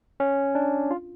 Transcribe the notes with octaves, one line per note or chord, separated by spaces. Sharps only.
C#4
D4
F4